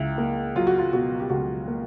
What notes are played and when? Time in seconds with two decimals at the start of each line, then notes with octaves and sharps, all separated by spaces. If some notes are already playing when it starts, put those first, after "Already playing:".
Already playing: C#2 E4
0.18 A#3
0.56 F#3 F4
0.67 F#4
0.78 F4
0.93 B2 F#4
1.20 G4
1.30 C#2 F#4
1.68 A#3